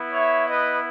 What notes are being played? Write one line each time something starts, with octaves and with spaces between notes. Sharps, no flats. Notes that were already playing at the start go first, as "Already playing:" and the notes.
Already playing: B3 E4
C#5 E5
B4 D#5